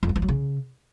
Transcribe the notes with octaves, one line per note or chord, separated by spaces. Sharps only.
F2
F#3
F3
F#3
C#3